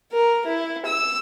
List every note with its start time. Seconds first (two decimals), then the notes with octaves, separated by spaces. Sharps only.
0.12 A#4
0.46 E4
0.86 E6